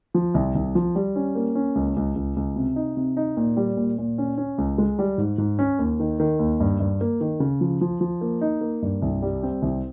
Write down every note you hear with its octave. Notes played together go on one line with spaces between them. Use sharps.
F3
C2
C2
F3
G3
C#4
A#3
C#4
C#2
C#2
C#2
C#2
C3
D#4
C3
D#4
A#2
G3
A#2
A#2
C#4
C#4
C#2
G#3
G3
G#2
G#2
C#4
D#2
D#3
D#3
D#2
G2
G2
A#3
D#3
C#3
F3
F3
F3
A#3
D#4
A#3
G2
C2
G3
C4
C2